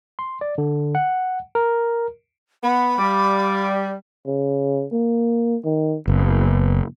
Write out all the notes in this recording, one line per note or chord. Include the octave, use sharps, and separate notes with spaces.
C6
D5
D3
F#5
A#4
B3 B5
G3 D5 F5 D6
C#3
A#3
D#3
F#1 B3